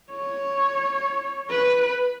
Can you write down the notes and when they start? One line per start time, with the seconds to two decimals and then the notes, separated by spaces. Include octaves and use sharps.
0.12 C#5
1.51 B4